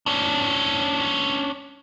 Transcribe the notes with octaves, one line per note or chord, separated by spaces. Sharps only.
C#4 D4